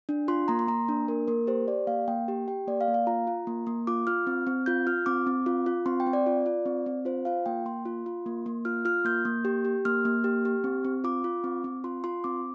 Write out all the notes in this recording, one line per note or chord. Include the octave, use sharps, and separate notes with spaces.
D4
F4 C6
A#3 A#5
C6
A#3 A#5
D4
A#3 A#4
A#3 A#4
G4 C5
G4 D5
A#3 F5
A#3 G5
G4
G4 G5
A#3 D5
F5
A#3
F5
F4 A#5
F4
A#3
A#3
F4 D6
F4 F6
C4
C4
F4 G6
F4 F6
C4 D6
C4
F4
F4
C4 C6
G5
C4
D5
F4
F4
C4
C4
F4 C5
F4 F5
A#3 G5
A#3 C6
F4
F4
A#3
A#3
F4 F6
F4 F6
A#3 G6
A#3
G4
G4
A#3 F6
A#3
G4
G4
C4
C4
F4 D6
F4
C4
C4
F4 C6
F4 C6
C4 D6